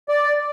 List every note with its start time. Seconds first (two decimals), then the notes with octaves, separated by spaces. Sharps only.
0.09 D5